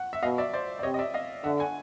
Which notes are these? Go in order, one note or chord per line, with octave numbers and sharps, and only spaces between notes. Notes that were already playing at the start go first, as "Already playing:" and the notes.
Already playing: F#5
E5
B2 D#5 F5
D5 E5
C5 D5
D5
C3 C#5 D#5
D#5
D5 E5
D#5 F5
D3 E5 F#5
F#5 G#5